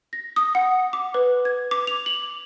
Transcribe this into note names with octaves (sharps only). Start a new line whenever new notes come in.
A#6
D#6
F#5
D6
B4
G#6
D6
F7
F#7